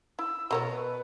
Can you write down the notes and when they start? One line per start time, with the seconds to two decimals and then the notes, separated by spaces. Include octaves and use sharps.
0.19 E4 E6
0.51 B2 F#4 A#4 C#5
0.69 B4